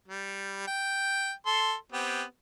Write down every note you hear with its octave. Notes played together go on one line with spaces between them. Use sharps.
G3
G5
A4 C6
B3 C4 G4